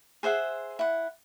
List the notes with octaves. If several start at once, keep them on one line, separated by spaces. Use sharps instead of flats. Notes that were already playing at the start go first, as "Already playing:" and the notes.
G#4 C5 E5 F#5
E4 F#5